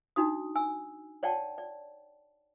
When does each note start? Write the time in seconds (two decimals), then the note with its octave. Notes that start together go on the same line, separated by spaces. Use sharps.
0.16 D4 D#4 F#4 D#6
0.56 G#5 E6
1.23 C#5 D5 F#5 G5 A5
1.58 D5